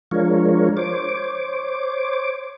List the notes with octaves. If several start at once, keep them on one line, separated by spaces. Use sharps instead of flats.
F3 G#3 D4 F4 A#4 C#5
C5 C#5 D6